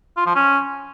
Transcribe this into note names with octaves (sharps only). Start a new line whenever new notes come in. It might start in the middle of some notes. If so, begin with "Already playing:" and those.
F4
F3
C#4